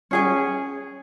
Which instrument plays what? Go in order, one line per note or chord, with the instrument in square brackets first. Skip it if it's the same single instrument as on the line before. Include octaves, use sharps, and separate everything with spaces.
[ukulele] C#4 G#4 G#5